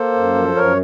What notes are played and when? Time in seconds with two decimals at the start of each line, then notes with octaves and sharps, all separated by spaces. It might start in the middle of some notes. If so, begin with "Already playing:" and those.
Already playing: A#3 A4 C5
0.14 F#2
0.35 F3
0.55 F#2 A#4 C#5